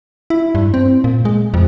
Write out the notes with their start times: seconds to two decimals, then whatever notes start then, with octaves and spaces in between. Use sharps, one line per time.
0.30 E4
0.55 G2
0.74 C4
1.04 A#2
1.25 G#3
1.54 F2